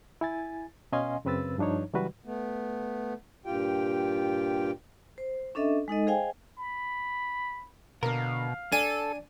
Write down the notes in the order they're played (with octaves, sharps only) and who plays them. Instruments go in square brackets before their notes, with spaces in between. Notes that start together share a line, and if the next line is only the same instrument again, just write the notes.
[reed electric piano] E4 G#5 A6
B2 C#4 D#5 F5 G#5 C6
F#2 C#3 C4 B4 E6 A6
G2 F3 D4 D#4 C#5
C#3 E3 F#3 G3 F#4 B4
[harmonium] A3 B3
G2 A#2 F4 G4 G5
[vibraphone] C5
C#4 D4 A4 D#5 E5
G#3 D#4 A4 D#5
G#4 C5 D#5 F5 G5 G#5
[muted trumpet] B5
[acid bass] B2 [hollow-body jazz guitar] D3 A#3 A#4 [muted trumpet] F5
[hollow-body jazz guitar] D4 [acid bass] A4 [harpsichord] G#5